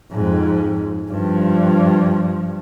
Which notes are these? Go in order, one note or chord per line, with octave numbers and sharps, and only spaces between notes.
F2 G#2
G2 F3